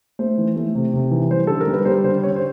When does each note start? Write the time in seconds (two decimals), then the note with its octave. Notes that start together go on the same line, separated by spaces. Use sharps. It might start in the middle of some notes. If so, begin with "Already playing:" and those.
0.19 A3 C5
0.38 E3
0.56 A3
0.75 C3
0.93 C3
1.11 E3
1.30 G3 C5
1.47 D3 A4
1.61 A#4
1.67 G3
1.73 B4
1.85 G3 C5
2.04 D3 C5
2.23 D3 C#5
2.36 C5